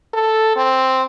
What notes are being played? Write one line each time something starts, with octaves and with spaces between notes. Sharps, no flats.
A4
C4